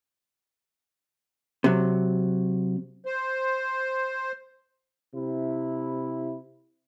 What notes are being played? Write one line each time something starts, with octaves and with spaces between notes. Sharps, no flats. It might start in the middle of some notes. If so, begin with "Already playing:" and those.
C3 F#3
C5
C3 E4